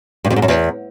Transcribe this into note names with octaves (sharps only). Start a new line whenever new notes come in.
G2
F2
G#2
F#2
E2